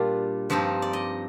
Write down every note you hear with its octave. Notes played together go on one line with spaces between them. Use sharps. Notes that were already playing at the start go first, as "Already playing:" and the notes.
Already playing: A#2 G3 D4 F4
G2 F3 C4 D#4
D5
D#5